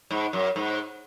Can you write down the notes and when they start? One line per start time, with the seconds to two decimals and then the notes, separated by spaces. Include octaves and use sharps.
0.11 G#2
0.33 F#2
0.56 G#2